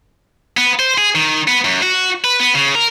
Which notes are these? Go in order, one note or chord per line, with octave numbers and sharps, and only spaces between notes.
B3
C5
G#4
D#3
B3
F#2
F#4
B4
B3
C#3
A#4